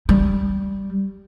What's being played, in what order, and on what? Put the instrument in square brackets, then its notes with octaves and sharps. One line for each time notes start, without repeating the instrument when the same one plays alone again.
[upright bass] G3